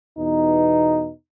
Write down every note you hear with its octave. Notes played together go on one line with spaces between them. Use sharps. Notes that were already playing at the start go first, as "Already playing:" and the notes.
E2 B2 D#4